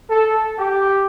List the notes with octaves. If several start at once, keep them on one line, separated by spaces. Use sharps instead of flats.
A4
G4